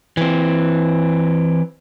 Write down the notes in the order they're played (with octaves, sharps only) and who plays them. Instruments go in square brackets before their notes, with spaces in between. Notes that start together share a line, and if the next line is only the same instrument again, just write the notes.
[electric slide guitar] E3 C4